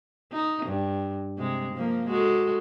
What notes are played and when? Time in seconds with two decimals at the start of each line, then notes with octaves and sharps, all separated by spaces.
0.32 D#4
0.66 G2
1.38 C3 G#3
1.74 F3 A#3
2.08 G#3 F#4 A4